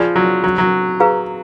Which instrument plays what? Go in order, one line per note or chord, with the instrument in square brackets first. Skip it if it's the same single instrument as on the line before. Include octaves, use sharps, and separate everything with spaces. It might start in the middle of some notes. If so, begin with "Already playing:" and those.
Already playing: [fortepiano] F3 [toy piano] G#4 D5 G#5 B5
[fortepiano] F#3
F#3
F#3
[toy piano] G#4 B4 F5 A#5